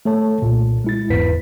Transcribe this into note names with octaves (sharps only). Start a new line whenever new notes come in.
A3 A4 C#5 A5
C2 A#2
G#3 E4 A6
G1 E2 G#2 B4 B6